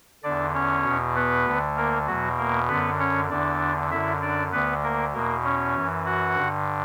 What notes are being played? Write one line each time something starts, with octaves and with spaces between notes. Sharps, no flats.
E2 D3 D4 D5
C#4 C#5
E2 B2
B3 B4
D2 D3
A#3 A#4
E2 B2 F#3 F#4
A#3 A#4
F#2 D3 B3 B4
C#4 C#5
E2 D3 D4 D5
F#2 D3 E4 E5
D4 D5
D2 D3 B3 B4
A#3 A#4
E2 B2 A#3 A#4
C#4 C#5
F#2 E3
F#4 F#5
G2 D3